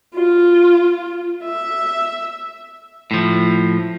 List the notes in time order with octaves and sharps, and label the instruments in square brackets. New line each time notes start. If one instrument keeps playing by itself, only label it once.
[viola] F4
E5
[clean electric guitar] A2 F3